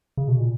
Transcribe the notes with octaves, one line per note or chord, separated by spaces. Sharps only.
C#3
B2
A#2